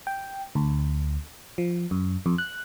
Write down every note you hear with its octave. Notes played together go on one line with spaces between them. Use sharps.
G5
D2
F3
F#2
F2
F#6